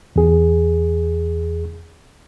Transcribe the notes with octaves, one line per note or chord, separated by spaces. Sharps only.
E2 G#4